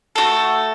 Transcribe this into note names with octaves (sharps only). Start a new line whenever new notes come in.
A3 D4 F#4 A4